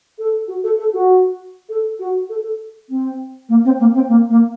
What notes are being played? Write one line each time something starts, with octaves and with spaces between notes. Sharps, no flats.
A4
F#4
A4
A4
F#4
A4
F#4
A4
A4
C4
A#3
C4
A#3
C4
A#3
A#3